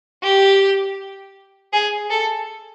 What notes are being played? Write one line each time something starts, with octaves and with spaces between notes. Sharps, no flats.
G4
G#4
A4